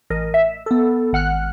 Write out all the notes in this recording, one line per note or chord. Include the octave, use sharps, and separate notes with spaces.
A1 A#4 D#5
E5
B3 A4
G#1 F#5 F6 F#6